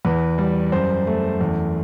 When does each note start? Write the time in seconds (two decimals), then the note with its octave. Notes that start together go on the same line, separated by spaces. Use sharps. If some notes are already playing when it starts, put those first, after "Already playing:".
0.05 E2 B4
0.38 G3
0.72 F#2 C5
1.07 A3
1.41 E2